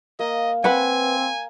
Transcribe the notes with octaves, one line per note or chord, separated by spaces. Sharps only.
A#3 D#5
C4 B4 F#5 G#5